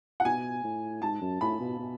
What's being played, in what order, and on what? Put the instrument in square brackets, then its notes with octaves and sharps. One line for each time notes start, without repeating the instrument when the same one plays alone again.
[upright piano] F#5
[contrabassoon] B2 [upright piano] G#5
[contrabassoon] A2
[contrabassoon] G#2 [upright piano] A5
[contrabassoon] F#2
[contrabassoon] A2 [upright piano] B5
[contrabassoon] B2
B2